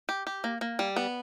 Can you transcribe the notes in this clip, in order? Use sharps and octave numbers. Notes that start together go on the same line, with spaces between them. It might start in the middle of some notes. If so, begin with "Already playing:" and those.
G4
G4
A#3
A#3
G3
B3